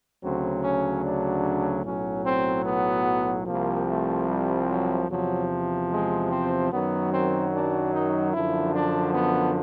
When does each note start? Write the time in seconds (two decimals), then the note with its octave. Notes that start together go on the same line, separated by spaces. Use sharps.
0.22 D2 C#3 F#3 C4
0.63 C#4
1.03 D4
1.84 B1 A2 F#3 C#4
2.25 C4
2.65 B3
3.46 C2 C3 F3 A#3
3.87 A3
4.28 G3
4.68 F#3
5.09 E2 C3 F3 F#3
5.90 G#3
6.30 C4
6.71 F#2 D#3 F#3 B3
7.12 C4
7.52 D4
7.92 D#4
8.33 F#2 D3 F3 E4
8.74 D4
9.14 B3